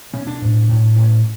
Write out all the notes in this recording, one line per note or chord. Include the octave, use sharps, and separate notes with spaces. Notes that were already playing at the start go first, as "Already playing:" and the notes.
B2 C#4
D4
A2
A2
A2 C#4